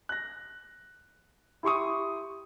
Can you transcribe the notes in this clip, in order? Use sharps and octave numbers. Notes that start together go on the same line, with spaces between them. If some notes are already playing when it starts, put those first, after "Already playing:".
F#6 A#6
E4 G4 C6 C#6 D#6